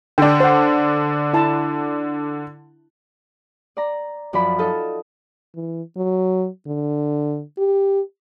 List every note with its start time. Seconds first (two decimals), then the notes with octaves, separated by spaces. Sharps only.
0.18 D3 D4 G5
0.40 C5 F#5
1.34 E4 A5
3.77 D5 A#5
4.33 F#2 F3 D5 B5
4.58 D#4 F4 F#4 A4 D#5 A5
5.55 E3
5.97 F#3
6.67 D3
7.58 G4